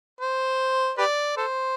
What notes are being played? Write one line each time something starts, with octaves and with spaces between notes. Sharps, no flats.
C5
G4 B4 D5
A4 C5